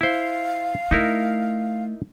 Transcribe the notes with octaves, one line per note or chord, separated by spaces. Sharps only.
E4 C5 F5
A3 D#4 E4 A#4